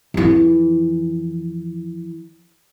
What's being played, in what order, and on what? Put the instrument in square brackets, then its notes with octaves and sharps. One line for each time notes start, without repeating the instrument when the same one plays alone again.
[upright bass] F2 E3